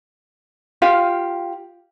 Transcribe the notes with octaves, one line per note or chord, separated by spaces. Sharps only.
F4 G4 F5